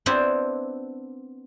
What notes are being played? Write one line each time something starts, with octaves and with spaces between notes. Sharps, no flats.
B3 C4 D4 E4 G4 C5